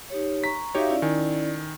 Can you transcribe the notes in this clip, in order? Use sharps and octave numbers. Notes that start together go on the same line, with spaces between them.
D#4 G4 C#5
A#5 C#6 B6
D#4 F#4 G4 C#5 E5 F5
C#4 E4 D5
D#3 G#5